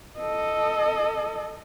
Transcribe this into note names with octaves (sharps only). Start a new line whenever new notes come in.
A4 D#5